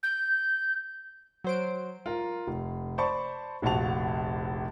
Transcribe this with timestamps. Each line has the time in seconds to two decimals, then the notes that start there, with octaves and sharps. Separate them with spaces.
0.03 G6
1.44 F#3 C5 D7
2.06 F4 A#4
2.47 F1
2.98 C5 D5 A5 B5 C#6
3.62 F1 A#1 F#4 F5 A5 F7